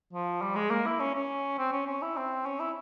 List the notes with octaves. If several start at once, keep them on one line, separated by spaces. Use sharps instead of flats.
F3
G3
G#3
A#3
E4
C#4
C#4
C4
C#4
C#4
E4
C4
C#4
E4